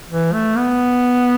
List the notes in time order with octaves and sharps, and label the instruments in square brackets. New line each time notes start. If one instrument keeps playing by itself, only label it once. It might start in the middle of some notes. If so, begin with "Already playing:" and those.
[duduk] E3
A3
B3